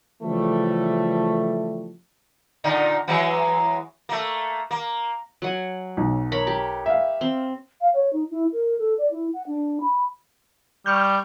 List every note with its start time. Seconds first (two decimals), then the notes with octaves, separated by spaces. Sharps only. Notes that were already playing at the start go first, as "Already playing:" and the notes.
0.22 C#3 E3 F3 G3 A3
2.64 A#2 D3 D#4
3.08 E3 F#3 G#3
4.09 A3 A#3
4.71 A#3
5.42 F#3 F#5 G#5
5.97 B1
6.32 A#4 C#5 B5
6.47 G4
6.86 E5 F5
7.21 C4
7.81 F5
7.94 C#5
8.13 D#4
8.30 E4
8.53 A#4
8.78 A4
8.98 D5
9.11 E4
9.34 F#5
9.47 D4
9.80 B5
10.86 G3 C#6 F6 G6